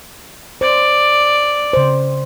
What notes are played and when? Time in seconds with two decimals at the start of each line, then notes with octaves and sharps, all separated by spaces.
0.61 C5 D5
1.73 C#3 C5